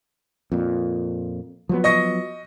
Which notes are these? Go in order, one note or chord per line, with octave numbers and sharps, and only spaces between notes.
F2 A#2
F3 F#3 B3
D#5 C#6 A#6